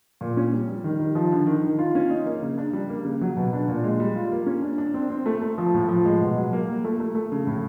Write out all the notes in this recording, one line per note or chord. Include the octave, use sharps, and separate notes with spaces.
A#2
C#4
G3
G3
D#3
D#3
F3
D3
D#3
D#3
F4
C#4
D#4
A#3
C#3
D4
G3
A#3
C#3
F#3
B2
D4
A#2
G#3
G3
F4
A#3
C#4
D4
D4
C4
C4
A3
A3
F3
A2
F3
G#3
B2
F#3
A#3
G3
A3
A3
A3
C#3
A2